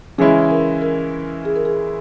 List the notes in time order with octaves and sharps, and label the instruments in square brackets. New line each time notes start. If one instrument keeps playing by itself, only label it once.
[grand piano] C#3 E3 G#3 C#4 E4 [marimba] G#4
[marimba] A#4
A#4
G#4
A#4
G#4